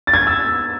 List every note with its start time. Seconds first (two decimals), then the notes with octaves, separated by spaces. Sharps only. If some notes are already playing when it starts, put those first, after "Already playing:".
0.07 A6
0.13 G#6
0.27 E6